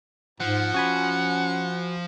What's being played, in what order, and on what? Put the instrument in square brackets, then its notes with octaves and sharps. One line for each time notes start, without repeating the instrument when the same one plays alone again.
[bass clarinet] G#2 [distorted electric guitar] F3 [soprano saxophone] F#5
[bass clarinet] C#4 [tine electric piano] F#4 G#5 B5